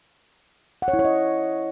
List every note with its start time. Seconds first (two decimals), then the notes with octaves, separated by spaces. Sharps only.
0.82 F#5
0.88 C#5
0.94 E4
0.99 C#5
1.05 D#5